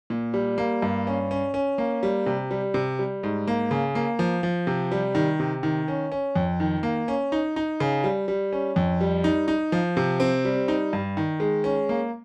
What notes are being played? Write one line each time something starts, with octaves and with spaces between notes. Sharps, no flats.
A#2
G3
A#3
G2
C#4
C#4
C#4
A#3
G3
C3
G3
C3
G3
G#2
A#3
C#3
A#3
F3
F3
C3
G3
D#3
C3
D#3
C#4
C#4
F2
D#3
A#3
C#4
D#4
D#4
C#3
G3
G3
C#4
F2
G3
D#4
D#4
F3
C3
C4
G3
D#4
G2
D#3
G#3
C#4
A#3